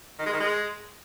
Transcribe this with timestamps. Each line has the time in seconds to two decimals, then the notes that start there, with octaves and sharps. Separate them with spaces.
0.19 D#3
0.26 G#3
0.33 D#3
0.40 G#3